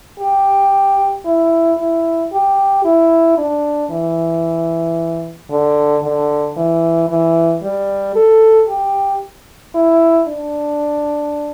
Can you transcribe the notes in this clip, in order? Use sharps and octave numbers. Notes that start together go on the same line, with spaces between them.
G4
E4
E4
G4
E4
D4
E3
D3
D3
E3
E3
G3
A4
G4
E4
D4